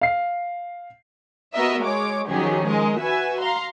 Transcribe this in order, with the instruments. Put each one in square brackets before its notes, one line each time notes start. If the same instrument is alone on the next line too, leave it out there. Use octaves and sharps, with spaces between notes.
[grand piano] F5 C7
[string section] B3 F#4 A#4 D#5 E5
G#3 C#5 D6
D#3 F3 F#3 C#4 G4 G#4
G#3 A#4 D#5
F#4 B4 E5 G#5
F5 A#5 C6